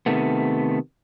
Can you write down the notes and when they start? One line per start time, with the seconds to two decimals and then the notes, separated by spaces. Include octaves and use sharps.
0.06 C3 D#3 A3 B3